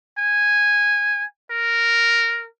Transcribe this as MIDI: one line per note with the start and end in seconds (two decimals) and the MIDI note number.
0.18 1.24 80
1.51 2.47 70